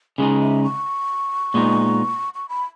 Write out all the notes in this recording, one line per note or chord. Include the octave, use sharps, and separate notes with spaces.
C#3 G#3 D#4 G#5
E5
C#6
A#2 G#3 B3 D#4
C#6
B5